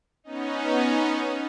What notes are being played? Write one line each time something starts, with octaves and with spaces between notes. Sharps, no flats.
B3 C#4 D#4